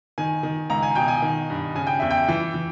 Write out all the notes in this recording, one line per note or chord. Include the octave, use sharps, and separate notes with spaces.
D#3 G#5
D#3
C#2 A#5
G#5
B2 G5
G#5
D#3
G2
C#3 G#5
G5
E2 E5
G5
E3
E3